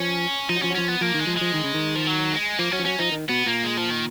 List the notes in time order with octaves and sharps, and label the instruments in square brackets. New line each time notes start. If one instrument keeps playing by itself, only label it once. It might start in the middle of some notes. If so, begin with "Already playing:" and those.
Already playing: [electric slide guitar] F3 [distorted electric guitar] C#4
[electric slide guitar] F3 [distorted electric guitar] D#4
[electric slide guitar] F#3
[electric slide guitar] F3 [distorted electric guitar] C#4
[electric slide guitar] F#3
[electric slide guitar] F3 [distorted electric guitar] C#4
[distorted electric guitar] B3
[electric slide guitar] F3 [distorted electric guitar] A#3
[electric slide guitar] D#3
[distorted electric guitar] G#3
[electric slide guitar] F3
[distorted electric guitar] G#3
[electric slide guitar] F3
D#3
C#3
D#3
[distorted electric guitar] F3
F#3
G#3
[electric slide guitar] F3 [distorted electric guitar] A#3
[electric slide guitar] F#3 [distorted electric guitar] C#4
[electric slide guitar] F3
[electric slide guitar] F#3 [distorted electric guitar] C#4
[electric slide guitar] F3 [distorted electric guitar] D#4
[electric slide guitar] D#3
[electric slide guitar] B2 [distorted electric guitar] B3
[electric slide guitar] A#2 [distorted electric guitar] A#3
[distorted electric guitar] G#3
F3
D#3